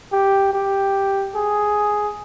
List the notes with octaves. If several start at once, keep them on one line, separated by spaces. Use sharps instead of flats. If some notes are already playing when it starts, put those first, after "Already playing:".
G4
G4
G#4